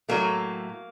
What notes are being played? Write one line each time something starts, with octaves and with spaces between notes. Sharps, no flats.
A2 F#3 A3 A#3